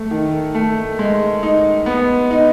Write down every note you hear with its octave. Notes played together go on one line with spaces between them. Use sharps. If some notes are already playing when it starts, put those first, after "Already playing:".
Already playing: A3
D#3
A3
G#3
D#4
B3
D#4